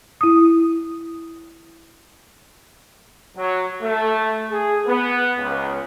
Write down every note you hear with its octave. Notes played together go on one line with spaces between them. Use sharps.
E4 D#6
F#3
A3
G#4
B3
C#2